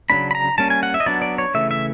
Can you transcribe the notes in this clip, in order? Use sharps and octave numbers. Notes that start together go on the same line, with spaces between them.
C#3 F#3 A#3 D4 B5
B5
A#5
G3 A#3 C#4 A5
G#5
F#5
E5
D#5
F#3 B3 D4 D5
D5
C#5
C#3 E3 A3 E5
E5